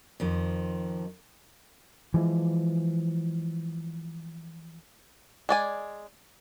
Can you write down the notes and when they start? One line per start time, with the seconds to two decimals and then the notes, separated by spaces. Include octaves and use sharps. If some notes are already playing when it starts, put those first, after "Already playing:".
0.20 F2 D#3 F3
2.14 E3 F3 G#3
5.49 G#3 D5 G#5